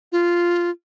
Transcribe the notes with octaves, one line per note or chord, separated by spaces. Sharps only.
F4